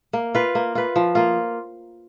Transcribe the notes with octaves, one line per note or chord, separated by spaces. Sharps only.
A#3
F4 B4
A#3
F4 B4
F3
A#3 F4